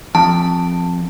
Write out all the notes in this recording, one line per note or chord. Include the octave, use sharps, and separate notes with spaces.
F2 A5